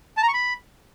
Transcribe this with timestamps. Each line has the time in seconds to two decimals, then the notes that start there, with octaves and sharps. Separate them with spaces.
0.17 A5
0.23 A#5
0.28 C#6
0.34 B5